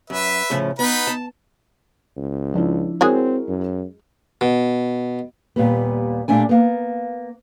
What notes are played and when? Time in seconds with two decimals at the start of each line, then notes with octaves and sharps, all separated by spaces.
0.10 F#2 B4 E5
0.50 A2 C#3 F3
0.79 B3 D#4 B4 B5
1.07 A5
2.17 C#2
2.54 F3 D4 E4
3.01 G#3 C4 E4 F#4 G#4 A#4 C#5
3.48 F#2
4.41 B2
5.56 D#2 A#2 G3 B3
6.28 A#2 G3 A3 D4 G#5
6.49 A#3 B3